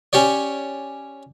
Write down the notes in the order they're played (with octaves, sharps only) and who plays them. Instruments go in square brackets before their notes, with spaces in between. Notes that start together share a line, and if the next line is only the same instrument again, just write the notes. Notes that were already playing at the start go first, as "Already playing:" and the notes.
[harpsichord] C#4 G4 C#5 D5